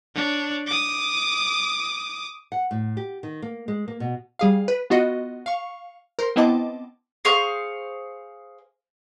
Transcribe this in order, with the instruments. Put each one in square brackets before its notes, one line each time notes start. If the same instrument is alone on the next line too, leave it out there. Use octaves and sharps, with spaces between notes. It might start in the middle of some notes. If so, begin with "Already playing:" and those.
[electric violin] D4 C#5
D6 D#6
[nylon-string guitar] F#5
A2
G4
D#3
A#3
G#3
A#3
B2
[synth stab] G3 G#4 F5
B4
B3 F4 F#4 D#5
F5 C#6
A#4 C5 C6
B3 C4 E4 D#5 A5 D6
[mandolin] G#4 C5 F5 C#6